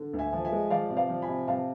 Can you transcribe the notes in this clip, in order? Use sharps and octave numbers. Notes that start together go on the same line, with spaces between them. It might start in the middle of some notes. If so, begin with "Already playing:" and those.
Already playing: D3
D2
E5 G#5
F3
E5 G#5
G#3
F3 D5 F5
C3
D5 F5
F3
G#5 B5
C3
C3 F5 A5